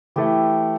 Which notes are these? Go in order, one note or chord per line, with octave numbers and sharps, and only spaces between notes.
E3 A3 E4 G4